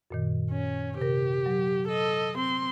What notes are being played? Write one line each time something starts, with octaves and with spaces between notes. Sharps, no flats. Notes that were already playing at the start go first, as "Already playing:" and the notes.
F#2 A#2 D#3
C#4
C3 G4 A#4
F#3
A4 D#5
C4 C6